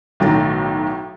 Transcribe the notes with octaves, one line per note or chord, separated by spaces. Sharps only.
B1 A2 D#3 G5 A#5 A6